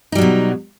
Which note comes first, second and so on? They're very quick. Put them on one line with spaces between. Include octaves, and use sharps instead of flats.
D#4 G3 F#3 B2